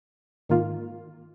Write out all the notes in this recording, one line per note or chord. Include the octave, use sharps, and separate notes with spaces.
G#2 D#3 A#3 F4